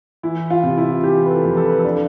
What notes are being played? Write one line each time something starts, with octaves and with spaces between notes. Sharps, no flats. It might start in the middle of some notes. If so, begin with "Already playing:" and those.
E3 E4
F4
C3
E4
E3 G4
B4
A4
F2
A4
B4
A4
D4